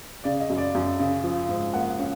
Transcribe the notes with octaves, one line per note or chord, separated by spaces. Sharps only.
C#3 D5
D#5
F#2
D5
F#2
C#3
F3
G#2
A#3 F#5
C#4 F5